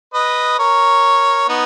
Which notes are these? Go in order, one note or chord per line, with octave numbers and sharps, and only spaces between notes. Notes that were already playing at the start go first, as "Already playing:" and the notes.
B4 D#5
A#4 C#5
B3 D#4